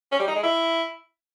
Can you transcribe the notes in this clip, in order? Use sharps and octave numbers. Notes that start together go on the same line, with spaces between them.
C#4
G3
D#4
G#3
E4